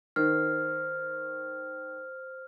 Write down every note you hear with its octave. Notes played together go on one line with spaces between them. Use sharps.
D#3 C5 F6